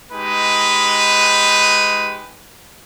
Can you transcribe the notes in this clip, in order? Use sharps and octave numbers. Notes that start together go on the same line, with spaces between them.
G#3 D#4 G4 B4